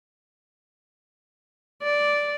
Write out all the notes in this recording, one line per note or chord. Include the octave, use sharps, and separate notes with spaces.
D5